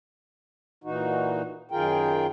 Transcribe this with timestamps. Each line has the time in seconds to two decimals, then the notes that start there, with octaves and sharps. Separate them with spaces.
0.84 A#2 E3 D#4 F#4
1.71 F#2 D#3 F4 G#4 A#4 G5